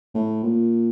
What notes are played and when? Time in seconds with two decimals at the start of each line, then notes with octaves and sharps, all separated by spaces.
0.14 A2
0.43 A#2